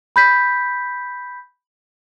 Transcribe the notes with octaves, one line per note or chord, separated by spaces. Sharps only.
B5 G6 B6